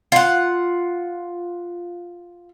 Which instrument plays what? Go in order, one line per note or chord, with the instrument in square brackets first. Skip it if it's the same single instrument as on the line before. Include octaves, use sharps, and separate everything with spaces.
[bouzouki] F4 F#5